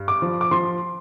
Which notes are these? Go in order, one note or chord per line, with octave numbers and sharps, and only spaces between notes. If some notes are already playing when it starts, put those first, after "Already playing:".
Already playing: G2
D6
F3
D6
F3 C6